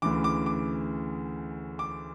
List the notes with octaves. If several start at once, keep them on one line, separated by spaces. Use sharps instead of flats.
D2 C#3 E3 D6
D6
D6
D6